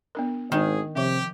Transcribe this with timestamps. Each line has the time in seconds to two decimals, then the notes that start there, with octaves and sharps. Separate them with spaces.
0.15 B3 D4 A#4
0.52 G#1 D#3 D4 G#4
0.96 C3 F3 G4 E5